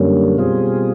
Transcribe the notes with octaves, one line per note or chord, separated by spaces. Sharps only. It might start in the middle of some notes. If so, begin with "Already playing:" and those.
Already playing: F#2 D3 G3 A#3 C#4
B2 G3 C4 F4 G#4